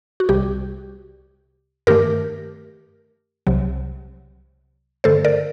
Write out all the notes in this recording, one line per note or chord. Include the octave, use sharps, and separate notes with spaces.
F#4
C2 C3 G3 G4
G2 D#3 A3 G4 A#4
C2 C3 F#3
G2 D3 A3 A4 C5
A#4 D5